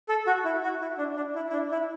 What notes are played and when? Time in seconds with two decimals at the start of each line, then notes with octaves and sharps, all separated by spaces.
0.09 A4
0.27 F#4
0.45 E4
0.63 F#4
0.81 E4
0.98 D4
1.16 D4
1.35 E4
1.49 E4
1.53 D4
1.72 E4